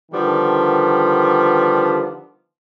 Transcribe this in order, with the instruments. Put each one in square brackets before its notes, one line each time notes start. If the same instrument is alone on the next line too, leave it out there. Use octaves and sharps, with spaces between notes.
[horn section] D3 D#3 F3 G3 B3